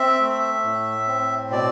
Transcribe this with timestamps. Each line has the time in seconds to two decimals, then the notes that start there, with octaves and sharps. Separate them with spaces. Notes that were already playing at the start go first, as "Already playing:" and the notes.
Already playing: C4 E5
0.20 A3
0.64 A2
1.08 C4
1.51 B2 D5